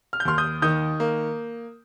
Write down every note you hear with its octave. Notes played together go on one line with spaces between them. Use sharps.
F6
G6
D#2 C6 F6
D#6 G6
D#3 D#6 G6
A#3